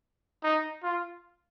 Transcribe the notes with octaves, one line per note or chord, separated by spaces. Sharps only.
D#4
F4